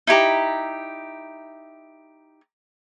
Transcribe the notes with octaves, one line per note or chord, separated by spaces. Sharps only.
D#4 E4 G4 A#5